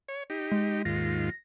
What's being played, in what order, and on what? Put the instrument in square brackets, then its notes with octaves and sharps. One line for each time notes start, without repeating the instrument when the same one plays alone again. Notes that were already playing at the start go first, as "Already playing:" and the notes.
[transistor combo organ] C#5
D#4 G4
[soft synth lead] G#3
[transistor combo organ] D#2 G#2 F4 [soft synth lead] A#6